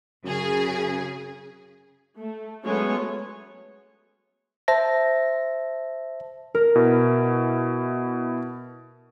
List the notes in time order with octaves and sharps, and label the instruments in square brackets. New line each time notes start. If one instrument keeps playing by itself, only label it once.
[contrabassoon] F#2 [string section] C#3 G#4
[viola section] A3
F#3 G#3 A3 B3 C#4 C#5
[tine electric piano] C5 E5 A5 A#6
[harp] A#4
[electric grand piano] B2 E4